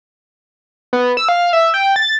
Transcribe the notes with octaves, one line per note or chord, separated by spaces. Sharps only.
B3
E6
F5
E5
G5
A6